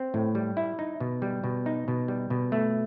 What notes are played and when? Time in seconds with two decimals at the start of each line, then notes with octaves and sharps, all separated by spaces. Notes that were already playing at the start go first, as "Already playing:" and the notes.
Already playing: C4
0.14 A2
0.35 G3
0.57 E4
0.79 D#4
1.00 B2
1.22 G3
1.44 B2
1.66 D#4
1.88 B2
2.08 G3
2.30 B2
2.52 A3